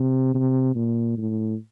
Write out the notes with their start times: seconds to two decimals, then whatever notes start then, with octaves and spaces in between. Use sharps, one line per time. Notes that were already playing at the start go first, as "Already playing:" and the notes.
Already playing: C3
0.34 C3
0.75 A#2
1.17 A2